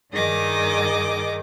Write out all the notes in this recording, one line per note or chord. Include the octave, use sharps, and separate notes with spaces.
G2 D#3 D#4 G#4 D#5 D6